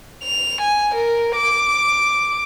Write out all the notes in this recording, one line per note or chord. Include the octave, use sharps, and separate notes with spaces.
F7
G#5
A#4
D6